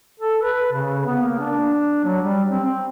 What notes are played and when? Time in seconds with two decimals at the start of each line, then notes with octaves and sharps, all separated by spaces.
0.20 A4
0.42 B4
0.73 C#3
1.06 B3
1.22 A#3
1.39 D4
2.04 F#3
2.23 G3
2.50 C4
2.64 C4